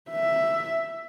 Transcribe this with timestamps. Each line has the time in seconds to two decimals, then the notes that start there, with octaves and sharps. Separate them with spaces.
0.10 E5